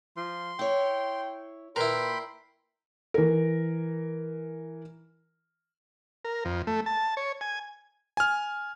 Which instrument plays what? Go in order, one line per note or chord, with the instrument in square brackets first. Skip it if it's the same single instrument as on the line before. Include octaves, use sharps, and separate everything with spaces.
[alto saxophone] F3 [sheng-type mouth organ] C6
[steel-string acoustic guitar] E4 C#5 [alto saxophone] G5
[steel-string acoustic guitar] A#2 [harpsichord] E4 A#4 [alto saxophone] B4 [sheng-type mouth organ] G5 B5 C6
[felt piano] E3 A#4
[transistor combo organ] A#4
F2
A3
A5
C#5
G#5
[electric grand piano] G#5 F6